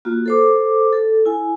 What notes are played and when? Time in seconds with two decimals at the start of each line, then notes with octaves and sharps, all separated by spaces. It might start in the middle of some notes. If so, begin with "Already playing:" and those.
0.05 A#3 F4 F#4
0.26 A4 C5 D6
0.93 A4
1.26 E4 G#5